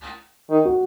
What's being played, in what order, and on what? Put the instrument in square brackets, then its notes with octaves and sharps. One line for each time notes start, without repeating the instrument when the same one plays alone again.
[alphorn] D#3
[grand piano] F#4